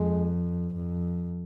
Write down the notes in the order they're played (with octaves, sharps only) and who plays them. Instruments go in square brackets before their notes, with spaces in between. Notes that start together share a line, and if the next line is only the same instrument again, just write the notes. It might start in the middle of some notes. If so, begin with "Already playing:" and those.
Already playing: [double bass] F2 [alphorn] G#3
[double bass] F2